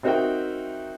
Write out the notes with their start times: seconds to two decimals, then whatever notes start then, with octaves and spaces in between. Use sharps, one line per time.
0.03 C4 D#4 F#4 A#4 E5 G5